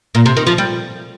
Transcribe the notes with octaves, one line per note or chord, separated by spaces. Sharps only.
A#2
C3
D#3
F3
G3